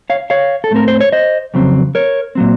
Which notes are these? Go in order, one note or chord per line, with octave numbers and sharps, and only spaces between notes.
C#5 F5
C#5 F5
A4
A2 A3 C4 A#4
C5
C#5
C5 D#5
F2 C#3 F#3 C4
A#4 C#5
A#2 F#3 C4